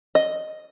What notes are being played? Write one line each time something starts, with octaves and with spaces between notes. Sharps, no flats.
D#5